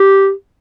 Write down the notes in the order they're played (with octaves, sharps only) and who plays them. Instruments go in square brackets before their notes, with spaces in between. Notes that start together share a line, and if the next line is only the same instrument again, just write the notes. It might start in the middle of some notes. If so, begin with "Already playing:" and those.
Already playing: [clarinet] G4